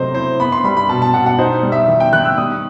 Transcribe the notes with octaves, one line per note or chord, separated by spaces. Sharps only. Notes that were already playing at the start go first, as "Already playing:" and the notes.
Already playing: C3 F#3 A3 C5 D#5
E4 C5
B3 B5
C6
G3 B5
B5
B2 A5
A5
B2 F#5
F#5
D#4 C5
G3
E5
D#3
G5
D#3 F#6
E6
G3 D#6